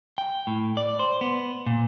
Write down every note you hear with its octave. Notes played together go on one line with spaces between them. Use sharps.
G5
A2
D5
C5
B3
A#2